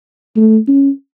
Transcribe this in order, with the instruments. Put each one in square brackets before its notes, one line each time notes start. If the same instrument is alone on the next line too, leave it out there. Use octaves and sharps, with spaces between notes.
[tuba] A3
C#4